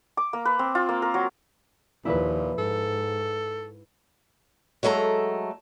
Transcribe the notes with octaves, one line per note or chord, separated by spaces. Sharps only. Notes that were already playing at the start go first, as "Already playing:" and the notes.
D6
A#3
B4
C4
F4
A#3
A#4
F#3
D#2 A#2 F3 E4 B4
G#2 A4
F#3 G#3 A3 A4 A#5